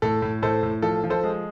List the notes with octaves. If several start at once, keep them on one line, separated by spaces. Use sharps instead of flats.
A2 A4
A2
A2 A4 C5
A2
F3 A4
F3
A4 C5
G#3